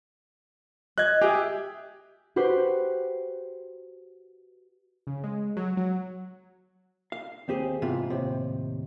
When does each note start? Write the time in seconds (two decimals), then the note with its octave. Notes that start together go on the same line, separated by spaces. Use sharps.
0.98 D#5 F#6 G#6
1.21 G4 G#4 E5 G5
2.36 F#4 G4 B4 C5
5.07 C#3
5.24 G#3
5.57 F#3
5.77 F#3
7.12 F5
7.48 D#2 C4 G4 G#4
7.82 G#2 C3 E3 B3 F4
8.10 D#2 A2 C3